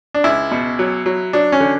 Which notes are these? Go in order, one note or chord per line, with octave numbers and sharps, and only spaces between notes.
D4
C#2 E4
B2
F#3
F#3
F#3 D4
C#4
D3